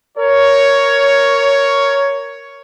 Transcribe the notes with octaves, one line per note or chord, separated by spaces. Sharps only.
A#4 C#5